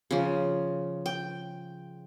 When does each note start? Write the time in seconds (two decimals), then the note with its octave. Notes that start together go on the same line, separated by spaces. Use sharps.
0.11 C#3 F3
1.06 G5